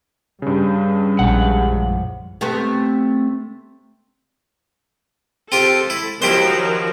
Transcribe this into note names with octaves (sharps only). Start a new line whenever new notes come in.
G2 C#3 G3
A#1 G#3 F#5
F#2 F3
C3 A3 B3
C4 F4 G4 A4
E4
D#3 F3 F#3 E4 G4 C5